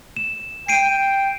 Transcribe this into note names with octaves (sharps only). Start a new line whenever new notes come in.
E7
G5 C7 D7 D#7